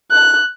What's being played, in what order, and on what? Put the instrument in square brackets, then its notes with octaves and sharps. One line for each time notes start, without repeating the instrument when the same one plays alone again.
[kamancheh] F#6